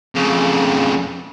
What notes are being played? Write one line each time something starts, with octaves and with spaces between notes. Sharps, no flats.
F2 C#3